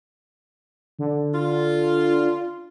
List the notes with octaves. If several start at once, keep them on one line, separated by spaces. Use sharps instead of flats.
D3
F4